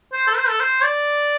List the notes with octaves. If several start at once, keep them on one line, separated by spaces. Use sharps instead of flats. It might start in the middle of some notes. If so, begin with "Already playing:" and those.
C5
A4
C5
A4
C5
D5